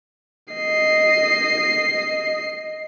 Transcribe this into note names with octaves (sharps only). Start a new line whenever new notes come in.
D#5 C7